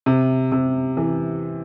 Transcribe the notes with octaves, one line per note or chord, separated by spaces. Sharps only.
C3
C3
E3